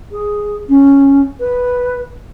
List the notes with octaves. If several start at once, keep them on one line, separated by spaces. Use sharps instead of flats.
G#4
C#4
B4